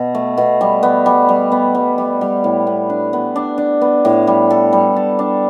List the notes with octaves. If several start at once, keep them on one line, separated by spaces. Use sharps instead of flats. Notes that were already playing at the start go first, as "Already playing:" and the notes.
Already playing: B2
A3
B2
G3
B3
G3
G3
B3
G3
G3
G3
A2
B3
D4
B3
D4
D4
B3
A2
G3
A4
G3
A4
D4